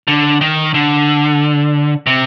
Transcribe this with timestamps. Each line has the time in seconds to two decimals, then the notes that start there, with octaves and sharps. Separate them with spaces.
0.08 D3
0.41 D#3
0.74 D3
2.07 C3